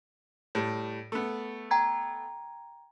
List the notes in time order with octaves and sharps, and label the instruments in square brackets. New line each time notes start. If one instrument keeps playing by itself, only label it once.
[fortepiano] A2 G3
A3 B3
[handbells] G5 A#5 G#6